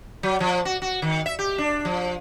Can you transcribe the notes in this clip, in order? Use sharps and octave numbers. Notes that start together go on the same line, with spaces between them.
F#3
F3
F#4
F#4
D#3
E5
G4
D4
F3